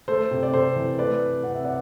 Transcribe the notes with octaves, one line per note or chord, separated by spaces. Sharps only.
A3 A4 C5
C3
D5
C3 A4 C5
E3
A3 B4 D5
C3
C3 F#5
E5
D5 F#5